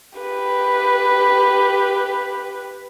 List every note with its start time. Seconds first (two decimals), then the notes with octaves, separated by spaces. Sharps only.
0.19 G4 B4